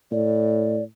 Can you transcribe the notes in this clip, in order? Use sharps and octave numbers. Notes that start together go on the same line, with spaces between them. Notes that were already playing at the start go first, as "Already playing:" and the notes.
A2 D5